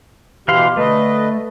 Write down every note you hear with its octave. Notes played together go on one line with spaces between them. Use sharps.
B2 E3 G4 F5 C6
D3 A3 B4 D#5